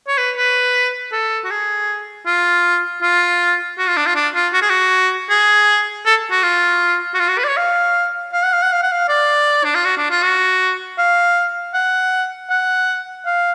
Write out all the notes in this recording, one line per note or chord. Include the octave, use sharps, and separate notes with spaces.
C#5
B4
B4
A4
F#4
G#4
F4
F4
F#4
F4
D4
F4
D4
F4
F#4
G#4
F#4
G#4
A4
F#4
F4
F#4
F4
F#4
B4
D5
C#5
F5
F5
F#5
F5
F#5
F5
F#5
F5
D5
D4
F4
F#4
D4
F4
F#4
F5
F#5
F#5
F5